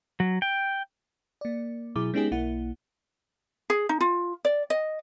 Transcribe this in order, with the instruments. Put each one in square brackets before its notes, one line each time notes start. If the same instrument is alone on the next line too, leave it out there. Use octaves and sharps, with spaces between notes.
[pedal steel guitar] F#3
G5
[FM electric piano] A#3 D5
B2 F#3 E4 G#4 D6
G#3 B3 C#4 D#4 G4 G#4
B1 A#3 E4 F#5
[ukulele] G#4
D#4
F4
D5
D#5